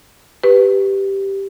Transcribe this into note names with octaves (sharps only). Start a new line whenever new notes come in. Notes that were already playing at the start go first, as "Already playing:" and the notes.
G4 B4